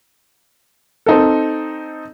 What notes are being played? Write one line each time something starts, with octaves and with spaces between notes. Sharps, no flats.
C4 D#4 A4